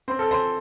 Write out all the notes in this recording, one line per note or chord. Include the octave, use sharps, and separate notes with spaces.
C4 C5
A4
C5